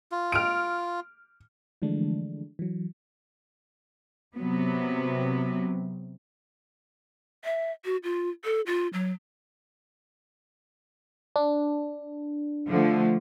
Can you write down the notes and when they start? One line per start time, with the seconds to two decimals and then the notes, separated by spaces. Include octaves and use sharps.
0.12 F4
0.32 F6 D7
1.82 D3 E3 F3 G#3 A3 D4
2.59 E3 F#3
4.37 C3 F#3 B3
7.45 E5
7.85 F#4
8.03 F4
8.44 A4
8.66 F4
8.93 F#3
11.36 D4
12.67 D3 F3 A3